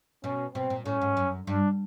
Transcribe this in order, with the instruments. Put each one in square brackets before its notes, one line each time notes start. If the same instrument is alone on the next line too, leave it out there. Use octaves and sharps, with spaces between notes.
[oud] B2 [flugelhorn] C#4
[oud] B2 [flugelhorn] C4
[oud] A#2
[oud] A2 [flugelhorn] C#4
[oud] G#2
F#2
[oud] G2 [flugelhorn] D4